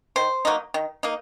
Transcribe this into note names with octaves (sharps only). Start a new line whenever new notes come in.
D#3 C5
F#3 A#3 D#4
D#3
A#3 D#4